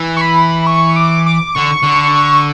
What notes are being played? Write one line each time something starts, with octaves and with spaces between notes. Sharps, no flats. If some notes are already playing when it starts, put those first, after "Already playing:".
Already playing: E3
C#6
B5
C#6
D6
D6
D3 C#6
D3